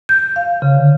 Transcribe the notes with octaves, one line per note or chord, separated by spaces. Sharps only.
G6
F5
C#3
D3